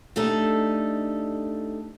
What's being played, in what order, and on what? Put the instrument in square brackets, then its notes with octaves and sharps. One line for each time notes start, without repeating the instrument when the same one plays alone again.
[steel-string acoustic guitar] A3 D4 D#4 G4 A4